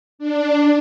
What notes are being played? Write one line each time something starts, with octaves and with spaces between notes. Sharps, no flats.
D4